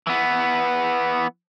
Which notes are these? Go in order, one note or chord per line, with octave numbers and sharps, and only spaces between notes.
E3 B3